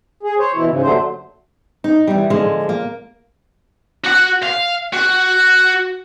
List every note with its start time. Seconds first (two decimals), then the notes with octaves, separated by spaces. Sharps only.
0.23 G#4
0.38 C5 C#5
0.54 B2 E3 E4
0.67 G#2 C#3
0.82 D#2 D3 F#3 A3 C5
1.84 D#4
2.07 E3 G3
2.30 D3 F3 G#3
2.69 A#3
4.04 F#4 F#5
4.43 F5
4.93 F#4